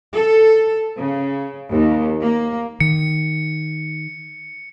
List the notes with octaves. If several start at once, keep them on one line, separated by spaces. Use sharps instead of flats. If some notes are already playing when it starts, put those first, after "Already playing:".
A4
C#3
D#2
A#3
D#3 C#7